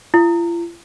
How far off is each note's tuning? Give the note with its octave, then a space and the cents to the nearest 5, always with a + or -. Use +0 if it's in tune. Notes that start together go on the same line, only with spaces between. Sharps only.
F4 -45